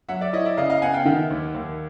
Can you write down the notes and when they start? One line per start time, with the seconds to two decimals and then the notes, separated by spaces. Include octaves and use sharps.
0.09 F#3 E5 F#5
0.21 D5 E5
0.33 E4 C#5 D#5
0.45 D5 E5
0.57 C#3 D#5 F5
0.70 D#5 F5
0.82 B3 F#5 G#5
0.94 F5 G5
1.05 D#3 E5 F#5
1.30 D#2
1.54 D#2